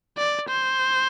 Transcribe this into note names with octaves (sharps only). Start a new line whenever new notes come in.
D5
C5